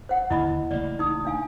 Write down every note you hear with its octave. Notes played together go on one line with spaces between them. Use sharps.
C5 F#5
D#2 D3 A#3 E4 D#5 B5
A1 C#3 A#3 D5
D#4 D#6
D4 F5 G#5